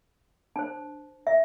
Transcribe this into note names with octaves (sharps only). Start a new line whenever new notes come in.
D4 C5 A5
E5